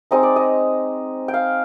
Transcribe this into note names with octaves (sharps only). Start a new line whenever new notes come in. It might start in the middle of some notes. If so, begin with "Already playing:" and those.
G#3 C4 D#4 D#5
D5
D#5
G5
F5